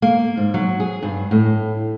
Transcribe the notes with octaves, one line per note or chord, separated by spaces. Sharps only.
A#3
G#2
F#3
G#4
G2
A2